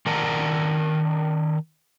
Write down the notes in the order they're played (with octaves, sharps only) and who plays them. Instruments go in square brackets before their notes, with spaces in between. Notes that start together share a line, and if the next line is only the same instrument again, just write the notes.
[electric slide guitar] D#3 A#4 D5 F#5 A5 A#5